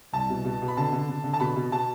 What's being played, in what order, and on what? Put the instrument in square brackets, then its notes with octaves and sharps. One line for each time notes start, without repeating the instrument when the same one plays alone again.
[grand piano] C2 A5
B2
B2
B2
B5
D3 A5
D3
D3
D3
A5
B2 B5
B2
B2 A5